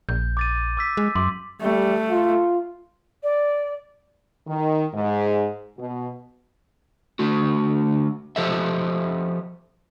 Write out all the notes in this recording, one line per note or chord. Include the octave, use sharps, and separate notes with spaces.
A#1 G6
D6 A6 D#7
D6 E6 B6
G#3
F#2 C6 D6
G3 A3
F4
D5
D#3
G#2
B2
D3 A3 F#4
F3 G4 A4 C5 D#5 E5